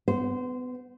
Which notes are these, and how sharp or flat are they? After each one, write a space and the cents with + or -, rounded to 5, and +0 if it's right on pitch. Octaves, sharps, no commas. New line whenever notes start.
B3 +25 C5 -20 F#5 -10